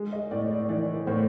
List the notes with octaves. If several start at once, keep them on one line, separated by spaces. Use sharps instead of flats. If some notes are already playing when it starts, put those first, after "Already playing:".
Already playing: G#3
D#5
A2 D5
D5
E3 D5
A2 C5